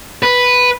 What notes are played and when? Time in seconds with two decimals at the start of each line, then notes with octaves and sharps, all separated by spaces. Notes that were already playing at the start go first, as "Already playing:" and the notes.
0.23 B4